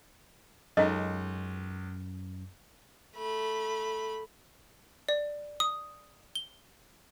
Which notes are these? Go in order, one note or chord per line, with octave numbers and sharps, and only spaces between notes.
C#2 F#2 C#4 D#4 A4 D#5
A3 B5
D5
D#6
G7